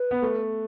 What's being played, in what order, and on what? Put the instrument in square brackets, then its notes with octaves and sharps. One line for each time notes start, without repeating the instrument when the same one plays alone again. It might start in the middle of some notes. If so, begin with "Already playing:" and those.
Already playing: [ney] B4
[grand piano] B3
A3